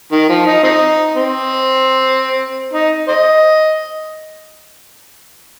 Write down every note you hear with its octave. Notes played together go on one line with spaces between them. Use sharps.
D#3
F3
D#4
C4 D#4
C4
D#4
C5 D#5